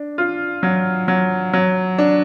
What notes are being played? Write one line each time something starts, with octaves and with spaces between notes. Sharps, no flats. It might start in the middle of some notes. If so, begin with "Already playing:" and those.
Already playing: D4
F4
F#3
F#3
F#3
D4